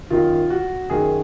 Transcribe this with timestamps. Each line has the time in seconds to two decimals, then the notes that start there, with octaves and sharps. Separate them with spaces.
0.10 F#2 D#3 F4
0.50 F#4
0.90 F#2 D#3 G#4